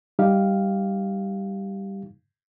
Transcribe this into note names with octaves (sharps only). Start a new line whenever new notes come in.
G3 D#4 G4 F5